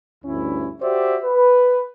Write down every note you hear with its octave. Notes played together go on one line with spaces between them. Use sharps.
D2 G2 C#4 E4
F#4 G4 C5 D5 E5
B4